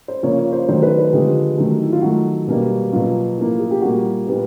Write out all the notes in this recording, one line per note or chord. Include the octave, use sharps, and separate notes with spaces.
C5
C#3 F3 A#3 C#5
C#5
C5
D#3 F#3 A3 C5
B4
B4
D3 F3 G#3 B3 G4
D#3 F#3 A3
E4
F4
D#3 F#3 A3 F#4
B2 G3 A#3
B2 F#3 A#3 F4
A2 F3 A#3
G#4
G4
A#2 G3 A#3 F#4
A#2 G3 B3